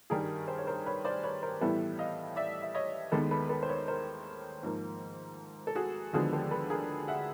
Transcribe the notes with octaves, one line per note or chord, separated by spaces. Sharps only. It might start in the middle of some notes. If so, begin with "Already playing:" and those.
G2 D#3 G3 G#4 A#4
C5
C#5
A#4 C5
B4 C#5
C5 D5
B4 C#5
A#4 C5
A2 E3 G3 B3 A4 B4
D#5 F5
D5 E5
E5
C#5 D#5
D#2 D#3 G#3 B3 A4 B4
A4 B4
A4 B4
C5
B4 C#5
A#4 C5
G#2 F3 A#3
A4
F#4 G#4
D#2 D3 F3 G#3 B3 F#4 G#4
G4 A4
A4 B4
G#4 A#4
E5 F#5